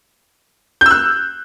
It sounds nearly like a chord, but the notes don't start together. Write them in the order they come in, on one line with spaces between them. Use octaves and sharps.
G6 E6 F#6